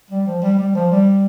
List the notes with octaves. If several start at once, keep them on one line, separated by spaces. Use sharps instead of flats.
G3
F3
G3
G3
F3
G3